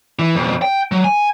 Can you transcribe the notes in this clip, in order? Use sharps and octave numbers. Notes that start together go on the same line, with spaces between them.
E3
F2 B2
G5
F#3
G#5